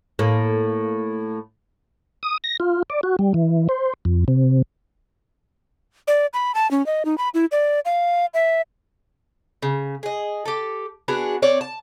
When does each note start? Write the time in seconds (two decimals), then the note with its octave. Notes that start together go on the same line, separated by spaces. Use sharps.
0.19 A2 A#3
2.23 D#6
2.44 A#6
2.60 F4
2.90 D5
3.03 F#4
3.19 G3
3.34 E3
3.69 C5
4.05 F2
4.28 C3
6.08 D5
6.33 B5
6.55 A5
6.71 C#4
6.86 D#5
7.05 D#4
7.18 B5
7.34 E4
7.52 D5
7.85 F5
8.34 E5
9.62 C#3
10.03 G#4 D#5
10.45 G4 A4
11.08 B3 D4 F#4 G#4
11.42 C4 C#5 D5
11.61 A5